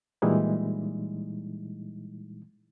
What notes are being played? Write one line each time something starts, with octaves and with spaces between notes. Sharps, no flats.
A#2 E3 G3 G#3 D#4 E4